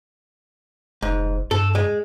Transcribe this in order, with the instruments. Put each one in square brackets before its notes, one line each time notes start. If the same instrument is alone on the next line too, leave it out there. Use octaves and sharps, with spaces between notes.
[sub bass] F1 [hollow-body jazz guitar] G#2
[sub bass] G2 [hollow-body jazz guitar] A4
[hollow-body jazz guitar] G#3